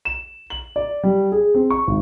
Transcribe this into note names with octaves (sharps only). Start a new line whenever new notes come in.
E7
F#7
D5
G3
G#4
C4
C#6
G#1